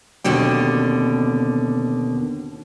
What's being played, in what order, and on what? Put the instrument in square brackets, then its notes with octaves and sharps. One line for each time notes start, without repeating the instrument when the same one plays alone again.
[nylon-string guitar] D#2 B2 D3 C4